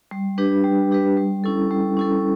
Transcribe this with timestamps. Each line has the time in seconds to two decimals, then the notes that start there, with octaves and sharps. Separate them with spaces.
0.11 G3
0.38 D4 G4 B4
0.64 G3
0.91 D4 G4 B4
1.17 G3
1.44 C#4 E4 A4
1.70 G3
1.97 C#4 E4 A4